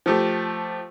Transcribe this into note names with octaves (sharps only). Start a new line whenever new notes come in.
F3 A3 G4